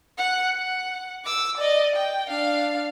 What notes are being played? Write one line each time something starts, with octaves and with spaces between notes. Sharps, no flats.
F#5
F#5
D6 E6
D5 D#5
G5
D4 F5